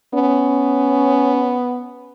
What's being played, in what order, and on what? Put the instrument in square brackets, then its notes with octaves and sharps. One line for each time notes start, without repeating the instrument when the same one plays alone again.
[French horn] B3 [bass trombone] C#4